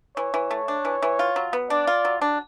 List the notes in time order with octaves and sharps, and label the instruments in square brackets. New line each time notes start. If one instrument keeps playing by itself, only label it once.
[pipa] E3 [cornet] C#5
[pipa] E3
A3
D4
E3
E3
F4
F#3
B3
[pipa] D4 [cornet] D5
[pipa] F4
F#3
D4